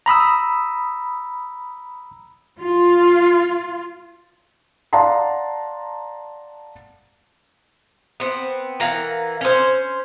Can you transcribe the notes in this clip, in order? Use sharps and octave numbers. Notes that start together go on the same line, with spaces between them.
A#5 B5 D#6 E6
F4
D5 F5 F#5 A5 A#5 C6
B3 C4
E3 A#4 F5 F#5
C#4 C5